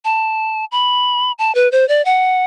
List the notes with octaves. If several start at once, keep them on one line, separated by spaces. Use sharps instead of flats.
A5
B5
A5
B4
C5
D5
F#5